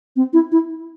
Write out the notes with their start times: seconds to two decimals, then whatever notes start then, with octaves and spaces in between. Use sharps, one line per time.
0.16 C4
0.33 E4
0.52 E4